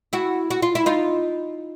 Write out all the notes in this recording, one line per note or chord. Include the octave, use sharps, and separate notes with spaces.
E4 F#4
F#4
F4
E4
D#4 F4